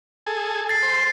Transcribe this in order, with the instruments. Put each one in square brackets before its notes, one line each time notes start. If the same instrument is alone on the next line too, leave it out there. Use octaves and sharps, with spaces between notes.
[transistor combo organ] G#4 A4
[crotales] A6 C7
[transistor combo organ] C5